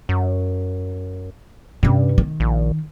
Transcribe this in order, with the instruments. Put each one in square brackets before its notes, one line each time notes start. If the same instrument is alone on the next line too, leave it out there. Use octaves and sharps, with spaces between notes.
[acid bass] F#2
[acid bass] G2 [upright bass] C3 C#4
[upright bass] D#3
[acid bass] A#1